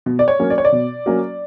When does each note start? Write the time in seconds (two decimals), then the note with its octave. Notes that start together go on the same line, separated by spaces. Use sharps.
0.06 B2
0.19 D5
0.28 C#5
0.39 F#3 A#3 C#4
0.50 D5
0.58 C#5
0.65 D5
0.72 B2
1.06 F#3 A#3 C#4